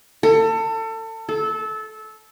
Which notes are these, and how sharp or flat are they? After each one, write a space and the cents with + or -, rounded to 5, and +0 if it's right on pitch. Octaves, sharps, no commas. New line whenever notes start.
A4 +30
A4 -20